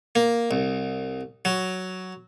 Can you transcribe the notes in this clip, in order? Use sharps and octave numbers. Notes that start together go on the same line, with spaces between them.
A#3
C2
F#3